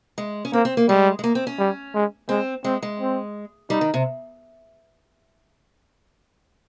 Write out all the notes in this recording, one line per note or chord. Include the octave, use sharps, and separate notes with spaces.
G#3
C#4
A#3 C4
C4
A#3
G3 G#3
G#3
A#3
C4
C#4
G3
G#3
G#3 C4
G#3 C4
G#3
C4
G3 D#4
D#3
C3